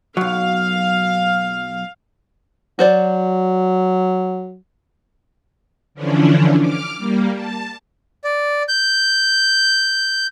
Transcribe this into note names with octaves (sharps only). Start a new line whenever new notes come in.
B1 F#3 F5
F#3 F#4 C5 D5
D3 E3 F3 C#4 D4
D6 F6
G3 A#3
A5
D5
G6